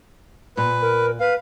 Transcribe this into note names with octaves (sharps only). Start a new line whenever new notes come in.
A#2 B4
A#4
B4 F5